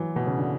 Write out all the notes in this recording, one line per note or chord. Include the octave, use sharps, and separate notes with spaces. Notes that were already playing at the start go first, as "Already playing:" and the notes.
Already playing: E3 F#3
B2
C#3
D3